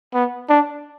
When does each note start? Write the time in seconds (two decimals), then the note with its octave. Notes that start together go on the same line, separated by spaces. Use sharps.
0.14 B3
0.49 D4